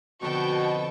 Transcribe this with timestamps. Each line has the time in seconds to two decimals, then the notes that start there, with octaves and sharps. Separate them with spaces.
0.22 F2 B2 D3 F#4 G5 A5 C#6